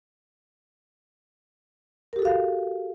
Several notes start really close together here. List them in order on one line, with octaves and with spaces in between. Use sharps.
A#4 G4 A4 F#4 F5